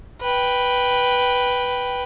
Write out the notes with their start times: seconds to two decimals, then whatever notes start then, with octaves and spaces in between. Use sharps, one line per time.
0.21 B4 G5